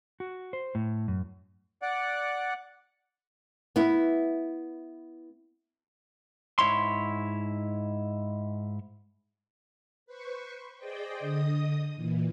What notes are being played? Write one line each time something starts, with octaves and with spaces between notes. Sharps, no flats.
F#4
C5
A2
F#2
D5 F#5
B3 E4
G#2 E4 C#5 C6
B4 C5 C#6
G#4 C5 D5 D#5 G5
D3 D#5 D#6
A#2 E3